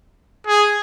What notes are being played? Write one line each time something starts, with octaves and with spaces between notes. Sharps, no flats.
G#4